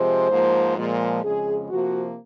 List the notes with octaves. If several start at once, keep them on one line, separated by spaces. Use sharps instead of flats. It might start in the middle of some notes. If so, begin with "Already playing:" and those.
Already playing: C3 F3 G#3 C5
G#2 F3 A#3
A#2 F3 G#3
F2 C#3 G#3 G#4
C3 F3 A#3 F#4